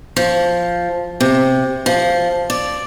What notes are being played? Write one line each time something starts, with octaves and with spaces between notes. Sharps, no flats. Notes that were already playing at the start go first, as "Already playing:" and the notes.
F3
C3
F3
D5